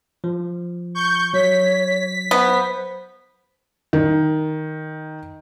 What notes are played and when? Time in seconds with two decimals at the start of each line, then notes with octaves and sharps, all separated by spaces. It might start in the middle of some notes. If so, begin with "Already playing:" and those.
0.24 F3
0.95 C#6 G6
1.34 F#3 C#5 B6
2.31 B3 C5
3.93 D#3